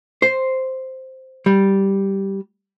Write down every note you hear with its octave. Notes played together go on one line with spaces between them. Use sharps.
C5
G3